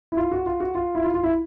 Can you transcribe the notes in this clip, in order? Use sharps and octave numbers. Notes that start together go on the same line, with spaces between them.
E4
F4
F#4
F4
F#4
F4
E4
F4
F4
E4